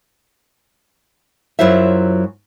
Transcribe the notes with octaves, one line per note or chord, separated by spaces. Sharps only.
F#2 F#3 E4 F4 C5 E5